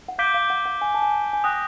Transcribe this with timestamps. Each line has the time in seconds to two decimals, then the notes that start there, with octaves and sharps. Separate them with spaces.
0.08 F#5
0.18 F5 D6 G6 B6 D7 G7
0.34 F5
0.50 F#5
0.65 F#5
0.81 G#5
0.94 A5
1.02 G#5
1.33 G#5
1.44 G5 D#6 F#6 A#6